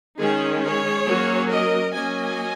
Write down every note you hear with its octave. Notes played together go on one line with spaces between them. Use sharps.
D#3 G#3 C#4 D#4 G#4
G#4 C#5
F#3 A#3 C#4
A#4 D#5
F#3 A#3 C#4 D#5 G#5